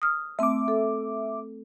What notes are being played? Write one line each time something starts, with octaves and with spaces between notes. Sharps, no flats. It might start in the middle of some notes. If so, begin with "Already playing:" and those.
D#6 F6
A3 C4 E5 D6
A4